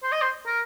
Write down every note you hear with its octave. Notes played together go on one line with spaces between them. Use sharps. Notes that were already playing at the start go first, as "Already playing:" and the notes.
C5
D#5
C5
A#4